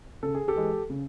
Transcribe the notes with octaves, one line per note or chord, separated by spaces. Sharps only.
C#3 A4
G#4
G4 A4
E3 G#3
C#3